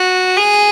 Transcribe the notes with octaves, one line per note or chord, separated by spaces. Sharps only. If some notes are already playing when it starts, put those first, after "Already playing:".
Already playing: F#4
G#4